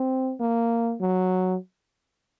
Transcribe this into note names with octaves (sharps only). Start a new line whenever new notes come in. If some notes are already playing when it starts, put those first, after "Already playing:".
Already playing: C4
A#3
F#3